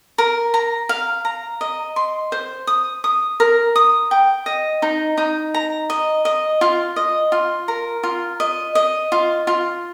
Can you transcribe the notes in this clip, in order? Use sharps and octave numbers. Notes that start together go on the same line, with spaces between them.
A#4
A#5
F5
A#5
D#5
C6
C5
D#6
D#6
A#4
D#6
G5
D#5
D#4
D#4
A#5
D#5
D#5
F4
D#5
F4
A#4
F4
D#5
D#5
F4
F4